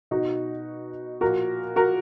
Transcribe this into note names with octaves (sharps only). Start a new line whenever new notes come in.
B2 D#4 F#4
A#2 F3 F#4 A#4
F#4 A#4